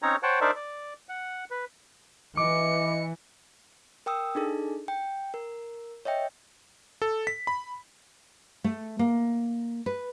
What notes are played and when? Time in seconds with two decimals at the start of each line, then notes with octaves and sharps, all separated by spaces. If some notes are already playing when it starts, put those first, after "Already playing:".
0.03 C4 C#4 D#4 C#5 A#5
0.23 C5 C#5 F#5 G5 A5
0.41 D4 D#4 A#4 C5 D5 E5
0.56 D5
1.09 F#5
1.51 B4
2.37 E3 D#5 D6 C#7
4.06 A#4 G5 D#6 E6
4.35 D4 D#4 G#4 A4
4.88 G5
5.34 A#4
6.05 C#5 D#5 E5 G5
7.02 A4
7.27 B6
7.47 B5
8.64 A3
8.99 A#3
9.86 B4